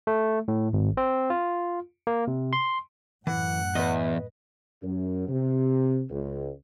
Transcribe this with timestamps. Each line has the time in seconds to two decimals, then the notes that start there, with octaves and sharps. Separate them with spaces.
0.07 A3
0.48 A2
0.73 G#1
0.97 C4
1.30 F4
2.07 A#3
2.27 C3
2.53 C6
3.27 F#2 A2 E3 F#5
3.75 E2 B4 D#5
4.83 F#2
5.28 C3
6.10 C#2